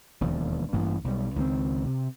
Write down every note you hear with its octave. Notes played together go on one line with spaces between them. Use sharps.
E1 D#2 F3
A1 G2 E3 A#3
B1 G3
C#2 D#3 A3 C4
C3